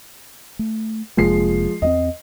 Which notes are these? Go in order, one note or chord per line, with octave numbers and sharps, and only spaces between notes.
A3
F1 C3 F3 G#3 A#3 C7
E2 A3 C4 D#5